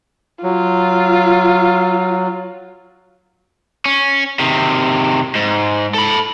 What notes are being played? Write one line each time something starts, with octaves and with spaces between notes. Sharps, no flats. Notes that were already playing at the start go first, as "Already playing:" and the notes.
F#3 F4
C#4
C3 D#3
G#2
A4 B5